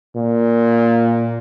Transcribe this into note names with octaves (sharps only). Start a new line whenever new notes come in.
A#2